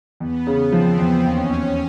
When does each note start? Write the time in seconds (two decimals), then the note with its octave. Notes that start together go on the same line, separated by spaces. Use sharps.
0.20 E2 B3
0.47 C#3
0.72 F3 C4
0.98 E2
1.24 D#2 C#4
1.49 D#2